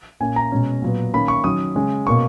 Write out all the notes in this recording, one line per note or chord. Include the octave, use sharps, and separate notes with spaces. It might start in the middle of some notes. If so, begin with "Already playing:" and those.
A#2 A#3 C#4 G#5
A#5
B2 G#3 C#4
A#2 F#3 B3
D#3 A#3 C#4 B5
C#6
D#3 F#3 C#4 D#6
C#3 G#3 C#4
B2 A#3 C#4 C#6